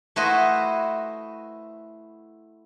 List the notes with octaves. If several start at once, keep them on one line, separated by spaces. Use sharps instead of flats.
A3 E4 F#4 B4 C5 D#5